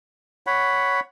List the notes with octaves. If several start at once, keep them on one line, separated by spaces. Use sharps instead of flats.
C#5 F#5 B5